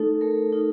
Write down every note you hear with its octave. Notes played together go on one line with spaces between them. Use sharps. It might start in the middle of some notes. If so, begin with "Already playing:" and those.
Already playing: A3 D#4 A4
A3 A#4
D#4